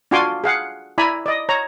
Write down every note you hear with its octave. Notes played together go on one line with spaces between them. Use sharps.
D4 F4 F#4 G#5 C6 D6
G#4 F5 F#5
E4 D5 G#5 A#5 B5
D5 D#5
C#5 A#5